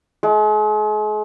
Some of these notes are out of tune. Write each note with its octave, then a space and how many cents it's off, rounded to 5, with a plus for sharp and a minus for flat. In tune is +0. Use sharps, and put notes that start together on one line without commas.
G#3 +40